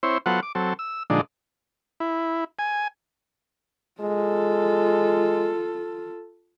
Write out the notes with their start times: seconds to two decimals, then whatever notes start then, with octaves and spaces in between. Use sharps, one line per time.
0.03 C4 E4 C5 C#5
0.26 F#3 B3 F4 A4 C5 F#5
0.43 D6
0.55 F#3 C4 A4
0.79 E6
1.10 A#2 D3 F3 G#3 D4 D#4
2.00 E4
2.59 G#5
4.01 G#3 F4 A4